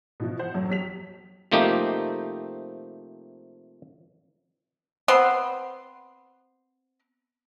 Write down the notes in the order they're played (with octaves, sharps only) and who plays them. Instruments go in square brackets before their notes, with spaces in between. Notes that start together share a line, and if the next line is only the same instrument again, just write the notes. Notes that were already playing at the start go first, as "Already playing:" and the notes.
[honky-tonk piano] B2 E3 F3
C5 F#5
F2 F#3
F#3 G4 B6 F7
[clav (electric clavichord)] C3 F3 A3 A#3 D#4 G4
[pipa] B3 C4 C6